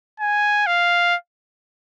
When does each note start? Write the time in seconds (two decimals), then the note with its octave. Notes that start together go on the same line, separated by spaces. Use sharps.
0.20 G#5
0.67 F5